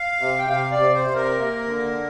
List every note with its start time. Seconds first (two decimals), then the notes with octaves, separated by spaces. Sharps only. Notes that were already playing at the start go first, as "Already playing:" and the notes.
Already playing: F5
0.20 C3
0.38 G5
0.49 C3 F5
0.72 D5
0.79 C3
0.94 C5
1.09 C3
1.16 A#4
1.39 A#3
1.67 D3